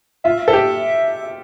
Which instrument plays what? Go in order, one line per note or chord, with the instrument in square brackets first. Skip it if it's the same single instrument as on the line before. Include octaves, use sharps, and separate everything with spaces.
[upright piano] F4 [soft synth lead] E5
[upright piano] A4
G4